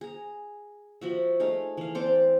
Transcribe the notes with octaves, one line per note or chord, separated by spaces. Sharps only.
G#4 A#5
F3 F#4 E5
A3 D#4 G#4 F5
E3 F5
C4 C5 D5 A5